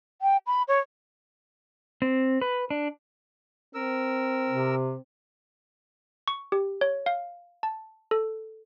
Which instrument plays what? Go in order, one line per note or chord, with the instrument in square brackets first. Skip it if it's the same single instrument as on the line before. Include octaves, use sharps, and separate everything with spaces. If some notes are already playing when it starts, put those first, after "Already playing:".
[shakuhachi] G5
B5
C#5
[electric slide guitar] C4
B4
D4
[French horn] C4 [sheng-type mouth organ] A#4 E6
[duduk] C3
[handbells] C#6
G4
C#5
F5
A5
A4